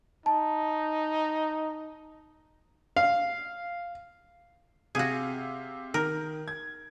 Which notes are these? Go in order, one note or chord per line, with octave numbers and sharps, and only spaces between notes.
D#4 A5
F5
C3 F#4 G#4 F5
D#3 A#4
G#6